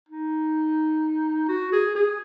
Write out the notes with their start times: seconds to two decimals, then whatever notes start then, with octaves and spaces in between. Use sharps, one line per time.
0.09 D#4
1.48 F#4
1.72 G#4
1.95 G#4